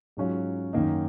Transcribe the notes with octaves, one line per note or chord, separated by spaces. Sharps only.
G#2 F#3 C#4 F4
F#2 D#3 A#3 D#4